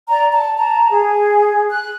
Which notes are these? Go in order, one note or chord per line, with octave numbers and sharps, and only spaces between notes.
D5 A#5
A5
A5 A#5
G#4
F#6